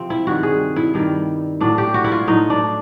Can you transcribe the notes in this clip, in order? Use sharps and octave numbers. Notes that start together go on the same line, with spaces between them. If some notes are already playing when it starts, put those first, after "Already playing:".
Already playing: C3 F3 C4
E4
G2 D#3 G3 F#4
G#4
E4
G2 D#3 G3
A2 F#3 D4
G4
F#4
E4
F4
A2 F#3 D#4
D4